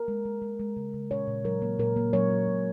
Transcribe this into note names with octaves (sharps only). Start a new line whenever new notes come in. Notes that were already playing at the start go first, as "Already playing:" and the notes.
Already playing: A#4
G#3
G#3
G#3
G#3
C#3
C#3
A#2 C#5
A#2
F#3 A#4
A#3
A#2 A#4
A#3
F#3 C#5
A#3
A#2